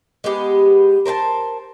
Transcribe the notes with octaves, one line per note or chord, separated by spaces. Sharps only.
G#3 B3 G4
A#4 C5 G5 A5